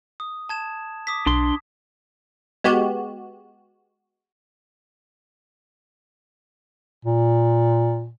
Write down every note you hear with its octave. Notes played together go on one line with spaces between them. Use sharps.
D#6
A5 G#6 E7
D6 D#6 B6
B1 D4 C6
G#3 B3 F#4 G4
A#2